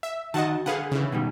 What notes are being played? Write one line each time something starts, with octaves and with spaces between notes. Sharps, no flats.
E5
D#3 F#4 D#5 F#5 A5
D3 G#4 B4 F5 F#5
C#3 E3
B2 D#3 G3